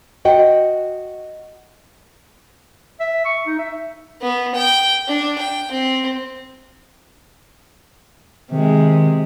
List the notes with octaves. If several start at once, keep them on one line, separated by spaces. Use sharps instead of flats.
F#4 D#5 F#5 G5
E5
C#6
D#4
E5
B3
G5
D4
G5
C4
C3 D#3 G#3